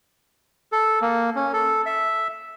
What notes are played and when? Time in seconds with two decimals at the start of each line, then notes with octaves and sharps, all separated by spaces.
0.72 A4
1.02 A#3
1.36 C#4
1.53 A4
1.86 E5